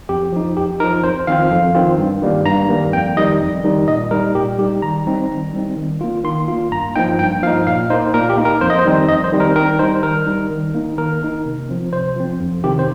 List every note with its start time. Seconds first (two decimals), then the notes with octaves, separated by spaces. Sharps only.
0.09 F2 G4
0.32 F3 D#4
0.57 F2 G4
0.80 F3 D#4 A#4
1.04 F2 C5
1.27 D#3 C4 F4 F5
1.51 F2
1.75 D#3 C4 F4
1.98 G2
2.22 D#3 G3 A#3
2.45 G2 A#5
2.69 D#3 G3 A#3
2.93 F2 G5
3.17 D#3 G3 D#4 D#5
3.40 F2
3.64 D#3 G3 D#4
3.88 A#2 D#5
4.11 G3 D#4 A#4
4.35 A#2 G4
4.59 G3 D#4 G4
4.82 D#3 A#5
5.06 G3 C4 D#4
5.30 D#3
5.54 G3 C4 D#4
5.77 D#3
6.01 A#3 F4
6.24 D#3 C6
6.48 A#3 F4
6.71 G2 A#5
6.96 F3 A#3 D#4 G5
7.19 G2 G5
7.43 F3 A#3 D#4 F5
7.67 A#2 F5
7.90 D#4 C5
7.93 A#3
8.14 A#2 A#4
8.30 G4
8.37 A#3 D#4
8.45 A#4
8.61 F2 C5
8.70 D#5
8.79 C5
8.85 D#3 G3 C4 D#4
9.08 F2 D#5
9.24 C5
9.32 D#3 G3 C4 D#4
9.40 A#4
9.56 D#3 A#4
9.79 G3 D#4 C5
10.03 D#3 A#4
10.27 G3 D#4
10.51 D#3
10.74 A#3 D#4
10.98 D#3 A#4
11.22 A#3 D#4
11.45 C3
11.69 F3 C4
11.93 C3 C5
12.16 F3 C4
12.40 F2
12.64 C3 D#3 C4 G4
12.79 C5